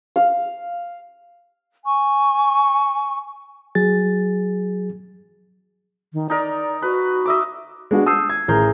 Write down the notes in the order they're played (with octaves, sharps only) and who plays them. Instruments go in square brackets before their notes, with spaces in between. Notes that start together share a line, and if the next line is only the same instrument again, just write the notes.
[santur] F5
[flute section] G#5 C#6
[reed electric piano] F#3 G#4 A6
[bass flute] D#3
[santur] D#4 A#4 [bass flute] D5
[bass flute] F#4 [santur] B4
[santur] D#5 E5 D6
[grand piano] G#3 B3 D4 F#4
A5 D#6 E6 G6 C7
G#6
A1 G#4 A#4 A#5 G6